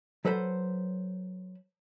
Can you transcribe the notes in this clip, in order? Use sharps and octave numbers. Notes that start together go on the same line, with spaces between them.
F#3 A4 B4 C5